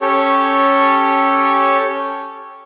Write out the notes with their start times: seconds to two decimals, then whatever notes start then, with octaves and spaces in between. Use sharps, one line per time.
0.01 C#4 G4 A4 C#5